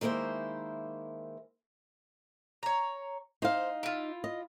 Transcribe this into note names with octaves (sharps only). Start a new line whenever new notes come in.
D#3 G#3 A#3 E4 C5
C#5 A#5
D#4 C5 F5
E4 F4
D#5